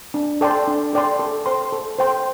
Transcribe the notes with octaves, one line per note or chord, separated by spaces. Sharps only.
D4
A4 D5 G5 C6
D4
A4 D5 G5 C6
A4
C5 G5 C6
A4
C5 G5 C6